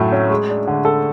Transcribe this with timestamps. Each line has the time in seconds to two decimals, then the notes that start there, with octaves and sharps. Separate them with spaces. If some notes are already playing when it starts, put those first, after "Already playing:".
Already playing: A2 F#3 A3
0.12 C#4
0.30 G#3
0.49 D4
0.68 D3
0.85 A4